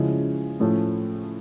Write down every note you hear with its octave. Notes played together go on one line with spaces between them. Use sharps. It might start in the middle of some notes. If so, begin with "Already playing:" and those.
Already playing: C#3 F3 G#3 C#4 E4
A2 F3 A3 C#4